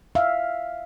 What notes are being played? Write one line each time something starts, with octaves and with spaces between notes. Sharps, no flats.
E5 F5